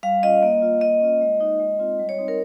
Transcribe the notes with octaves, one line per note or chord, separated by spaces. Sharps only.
G3 F5
C#4 F4 D#5
A#3
F4
A#3 D#5
C#4 F4
G#3
D#4
G#3
C4 F4
G3
C#5
C4 D#4
A#4